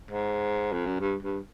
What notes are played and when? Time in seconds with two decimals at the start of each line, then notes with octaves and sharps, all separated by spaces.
0.11 G#2
0.73 F2
0.86 F#2
1.00 G2
1.23 G2